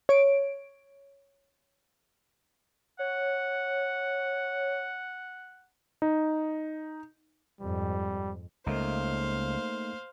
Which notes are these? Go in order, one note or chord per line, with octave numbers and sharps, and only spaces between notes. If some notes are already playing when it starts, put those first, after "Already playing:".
C#5 D7
C#5 F#5
D#4
F2 G#2 G3
C#2 A3 A#3 D#4 C5 F5